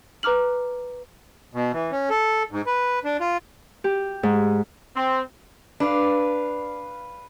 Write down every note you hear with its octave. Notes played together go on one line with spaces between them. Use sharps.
B4 A#5 D6 F6 F#7
B2
E3
C#4
A4
G#2
B4
D4
F4
G4
G#2
C4
D4 B4 F5